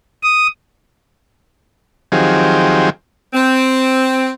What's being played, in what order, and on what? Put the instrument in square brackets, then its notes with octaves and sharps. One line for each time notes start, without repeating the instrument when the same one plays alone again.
[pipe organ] D#6
[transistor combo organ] D#3 F3 F#3 C4 G4 G#4
[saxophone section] C4